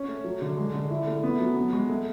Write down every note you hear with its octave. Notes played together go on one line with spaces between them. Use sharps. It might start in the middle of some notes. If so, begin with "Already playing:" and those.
Already playing: C#4
A3
F#3
D3
G#3
D3
E4
A3
B3
F#3
B3
G#3
A3